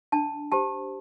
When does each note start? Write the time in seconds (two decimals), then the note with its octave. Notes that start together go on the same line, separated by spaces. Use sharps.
0.12 D4 A5
0.52 G4 C5 A5